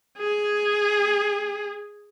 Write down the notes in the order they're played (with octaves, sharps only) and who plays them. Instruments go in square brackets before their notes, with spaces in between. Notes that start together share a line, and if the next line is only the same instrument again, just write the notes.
[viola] G#4